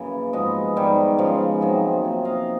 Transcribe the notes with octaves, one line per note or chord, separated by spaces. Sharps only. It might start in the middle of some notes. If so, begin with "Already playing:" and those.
Already playing: F#2 C#3 E3 A#3
G#2 F3 G#3 B3 D#5 F5
G#2 D#3 G3
C#3 F3 G#3
C3 D#3 F#3 A#3
C3 F3 A#3
D#5 F5